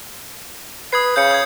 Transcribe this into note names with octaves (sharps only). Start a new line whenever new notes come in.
B4 D#6 G#6 C7
C#3 G6 C#7
D#6 G#6